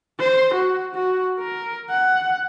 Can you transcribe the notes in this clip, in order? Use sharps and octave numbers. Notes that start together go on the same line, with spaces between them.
C5
F#4
F#4
A#4
F#5